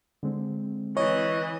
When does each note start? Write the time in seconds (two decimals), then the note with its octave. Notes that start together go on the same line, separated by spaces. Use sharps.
0.23 D3 G#3 C4
0.97 E3 C#5 D#5